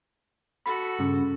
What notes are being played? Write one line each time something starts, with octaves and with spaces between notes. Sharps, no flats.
F#4 A4 B5
G2 C#3